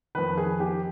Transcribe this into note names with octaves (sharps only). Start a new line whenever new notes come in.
F2 D#3 B4
G#4
G4